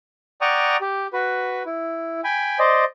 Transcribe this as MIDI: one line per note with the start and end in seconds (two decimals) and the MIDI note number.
0.41 0.77 74
0.41 0.77 78
0.41 0.77 79
0.41 0.77 82
0.41 0.77 85
0.41 0.77 87
0.81 1.07 67
1.13 1.63 66
1.13 1.63 71
1.66 2.21 64
2.24 2.59 79
2.24 2.59 80
2.24 2.59 83
2.59 2.84 72
2.59 2.84 74
2.59 2.84 75